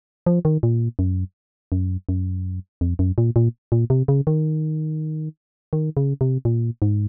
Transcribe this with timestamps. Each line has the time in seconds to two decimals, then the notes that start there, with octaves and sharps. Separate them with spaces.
0.26 F3
0.45 D#3
0.63 A#2
0.99 F#2
1.72 F#2
2.09 F#2
2.81 F2
2.99 F#2
3.18 A#2
3.36 A#2
3.72 A#2
3.90 C3
4.08 C#3
4.27 D#3
5.73 D#3
5.97 C#3
6.21 C3
6.45 A#2
6.82 G#2